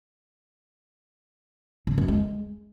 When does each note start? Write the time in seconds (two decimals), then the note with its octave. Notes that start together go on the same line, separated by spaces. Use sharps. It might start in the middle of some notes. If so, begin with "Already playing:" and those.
1.87 C#3
1.98 F#2
2.08 G#3